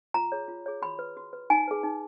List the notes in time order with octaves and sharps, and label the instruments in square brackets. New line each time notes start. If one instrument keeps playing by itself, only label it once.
[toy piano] F4 A#5
G#4 C#5
F4
G#4 C#5
F#4 B5
B4
F#4
B4
D#4 G#5
G#4 B4
D#4